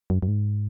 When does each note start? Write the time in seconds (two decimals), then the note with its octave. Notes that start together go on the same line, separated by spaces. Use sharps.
0.10 F#2
0.22 F#2
0.28 G#2